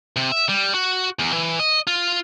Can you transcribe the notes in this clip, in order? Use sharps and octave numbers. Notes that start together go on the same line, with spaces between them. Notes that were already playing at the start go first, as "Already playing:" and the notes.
C3
E5
G3
F#4
E2
E3
D#5
F4